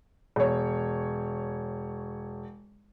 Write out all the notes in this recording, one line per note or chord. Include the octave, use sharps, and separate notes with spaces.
E1 C#5